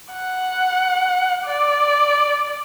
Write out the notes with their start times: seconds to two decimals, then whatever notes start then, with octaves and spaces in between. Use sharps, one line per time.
0.12 F#5
1.45 D5